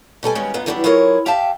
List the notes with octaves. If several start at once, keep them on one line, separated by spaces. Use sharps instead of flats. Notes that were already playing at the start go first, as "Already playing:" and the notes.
B2 G3 A4 G#5
D#2 G3 G#3 B3 C#4 C#5
G2 A#2 B3 D#4
E3 F#3 G3 A#3 B3 D4
F#3 E4 F4 G#4 A#4 C#5
G4 E5 F5 G5 A5